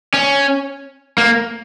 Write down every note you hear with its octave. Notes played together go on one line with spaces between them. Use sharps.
C#4
A#3